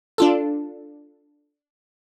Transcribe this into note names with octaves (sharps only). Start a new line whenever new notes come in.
D4 F4 A4